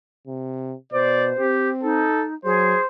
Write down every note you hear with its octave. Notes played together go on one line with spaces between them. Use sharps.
C3
B2 C5 D5
C4 G4
D#4 A4
F#3 G#4 C5